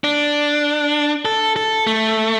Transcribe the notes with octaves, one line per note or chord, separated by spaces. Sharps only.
D4
A4
A4
A3